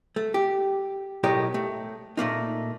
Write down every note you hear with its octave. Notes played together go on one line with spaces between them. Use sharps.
A3
G4
B1 A2 G4 A#4 C#5 D#5
A3
A#2 A3 A#3 D#4